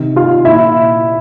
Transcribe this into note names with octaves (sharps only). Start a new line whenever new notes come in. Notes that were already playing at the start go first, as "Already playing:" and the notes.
Already playing: C3 D#3
F4 F5
A#2 E4 E5